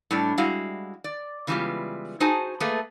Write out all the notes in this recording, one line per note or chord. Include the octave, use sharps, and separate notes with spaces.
A2 G3 D4
G3 G#3 E4 F#4 F5
D5
C#3 E3 G3 G#3 B3 F4
D#4 F#4 G#4 C5 G#5 A5
A3 A#3 G#4 B4